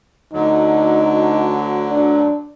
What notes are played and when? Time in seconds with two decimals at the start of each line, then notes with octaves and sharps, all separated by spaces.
0.33 D2 D3 F#3 D#4
1.90 D4